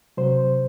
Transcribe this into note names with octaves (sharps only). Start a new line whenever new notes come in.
C3 F#3 C5